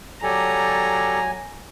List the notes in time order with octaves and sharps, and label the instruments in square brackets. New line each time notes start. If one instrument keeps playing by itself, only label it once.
[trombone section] F#3 [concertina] G4 A4 D5 [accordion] G#5 [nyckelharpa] A#5